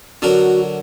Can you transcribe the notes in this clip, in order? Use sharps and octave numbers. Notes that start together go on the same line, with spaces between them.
D3 F#3 F#4 A#4